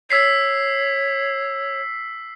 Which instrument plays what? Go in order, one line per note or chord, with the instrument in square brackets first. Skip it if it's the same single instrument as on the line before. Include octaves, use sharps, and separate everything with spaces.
[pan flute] C#5 [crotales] E6 B6 C7